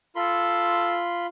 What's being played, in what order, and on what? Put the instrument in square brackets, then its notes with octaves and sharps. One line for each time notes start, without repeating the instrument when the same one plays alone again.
[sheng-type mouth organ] F4 B5 C6 [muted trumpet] A4